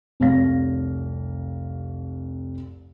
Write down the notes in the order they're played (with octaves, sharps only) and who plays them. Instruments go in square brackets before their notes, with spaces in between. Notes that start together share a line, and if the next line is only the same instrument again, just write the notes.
[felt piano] F1 C2 C#5 F5 A#6